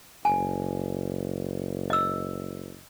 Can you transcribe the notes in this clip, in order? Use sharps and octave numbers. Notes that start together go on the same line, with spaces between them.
F#1 G#5
D#5 E6